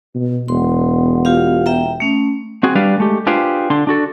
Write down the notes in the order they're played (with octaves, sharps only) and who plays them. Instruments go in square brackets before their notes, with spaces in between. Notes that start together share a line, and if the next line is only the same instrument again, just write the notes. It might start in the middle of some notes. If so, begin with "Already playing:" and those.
[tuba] B2
[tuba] E1 [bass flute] B3 [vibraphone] C6
[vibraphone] F4 G4 F5
E5 G5 A#5
A3 C#4
[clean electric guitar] C4 F#4 G#4
G3 D4 B4 D5 F5
G#3 A3 G4
D4 F4 G4 G#4 B4 C5
D3 D4 C6
D4 F#4 A4